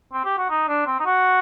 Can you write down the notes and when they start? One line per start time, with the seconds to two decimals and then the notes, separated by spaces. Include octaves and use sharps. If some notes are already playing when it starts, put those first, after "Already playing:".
0.13 C4
0.25 G4
0.38 F#4
0.50 D#4
0.68 D4
0.87 C4
1.00 D#4
1.06 F#4